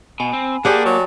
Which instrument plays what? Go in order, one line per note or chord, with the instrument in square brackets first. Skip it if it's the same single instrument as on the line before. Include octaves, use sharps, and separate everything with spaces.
[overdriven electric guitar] B2 [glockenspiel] G#5 B5
[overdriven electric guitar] C4
[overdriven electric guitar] A#3 [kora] G4 D5 F#5 [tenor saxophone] G#4 [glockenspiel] A5 C6
[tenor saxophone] F#3